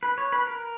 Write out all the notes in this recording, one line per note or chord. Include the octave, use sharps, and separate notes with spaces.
B4
C#5
B4
A#4